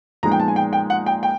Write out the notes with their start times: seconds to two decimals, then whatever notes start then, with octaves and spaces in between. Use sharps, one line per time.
0.23 A#2 F3 G#3 B3 D#4 A#5
0.32 G5
0.40 A5
0.48 G#5
0.56 G5
0.73 G5
0.90 F#5
1.06 G5
1.23 G5